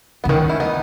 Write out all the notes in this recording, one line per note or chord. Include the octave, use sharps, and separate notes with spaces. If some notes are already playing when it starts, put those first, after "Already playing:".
C#3 B3
D#3 C#4
E4
B3 D#4